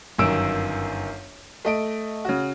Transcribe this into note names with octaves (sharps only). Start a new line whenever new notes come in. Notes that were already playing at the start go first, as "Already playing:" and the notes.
G1 F#2 D#3 E6 D7
A3 D#5 D7
C#3 F#4